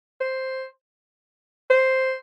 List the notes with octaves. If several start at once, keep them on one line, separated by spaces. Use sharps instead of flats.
C5
C5